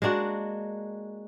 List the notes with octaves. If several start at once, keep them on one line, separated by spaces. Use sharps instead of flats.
G#3 A#3 D4 F#4